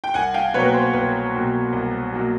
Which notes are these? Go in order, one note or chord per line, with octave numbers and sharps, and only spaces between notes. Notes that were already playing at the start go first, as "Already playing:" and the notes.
G5
C2 F#5 G#5
F5 G5
B2 F#3 A#3 B4 C#5
B4
C5
C2 B4
B2 F#3 A#3
C2
B2 F#3 A#3